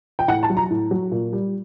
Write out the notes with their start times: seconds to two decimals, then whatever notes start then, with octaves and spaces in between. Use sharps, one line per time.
0.19 G5
0.28 A2 F#5
0.43 A5
0.50 F#3
0.57 A#5
0.71 A2
0.91 F#3
1.12 A#2
1.33 G3